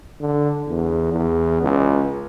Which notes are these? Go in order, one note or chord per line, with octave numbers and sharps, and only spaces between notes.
D3
E2
E2
C#2